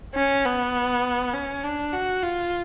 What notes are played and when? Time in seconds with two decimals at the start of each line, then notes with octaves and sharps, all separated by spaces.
0.15 C#4
0.45 B3
1.33 C#4
1.63 D4
1.93 F#4
2.23 F4